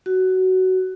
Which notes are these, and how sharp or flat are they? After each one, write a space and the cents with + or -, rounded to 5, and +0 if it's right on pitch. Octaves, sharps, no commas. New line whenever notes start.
F#4 +15